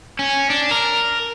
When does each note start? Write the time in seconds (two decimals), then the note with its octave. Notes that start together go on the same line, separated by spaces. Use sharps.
0.19 C#4
0.50 D4
0.71 A#4